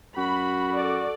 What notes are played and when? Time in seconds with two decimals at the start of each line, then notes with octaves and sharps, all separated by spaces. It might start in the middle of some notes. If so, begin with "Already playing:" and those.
0.17 F#2 F#4 B5
0.72 A4 D5